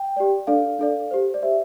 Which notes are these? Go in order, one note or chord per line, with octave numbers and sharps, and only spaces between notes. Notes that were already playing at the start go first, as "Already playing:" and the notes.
Already playing: G5
G4 D5
D4 A4 D5 F5
D4 A4 D5
G4 C5
D5
G4 C5 E5